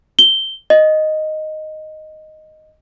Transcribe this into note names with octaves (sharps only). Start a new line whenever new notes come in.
G7
D#5